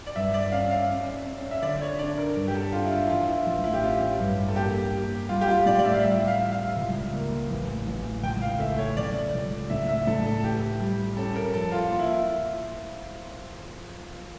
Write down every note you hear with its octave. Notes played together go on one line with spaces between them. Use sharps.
D5
G2 E5
D5
C#4 F5
F5
C#4
C#4
E5
D3 D5
C#5
D4 D5
A#4
G2
G4
A4
D4 F4
E4
F4
E4
E3 F4
E4
A1 F4
E4
G4
C#4 F4
G2
A4
A#3 G4
A#3
G3 F4
G4
F4
A2 D5
D5
E5
F5
G3 E5
F5
E3
F5
C#2
A#3
A1
A1
C#2 G5
F5
A3 E5
C#5
C#3 D5
C#2
A2 E5
E5
A2 A4
A4
E3 G4
G3
C#4 A4
A#4
F2 A4
F4
A#3 F4
E4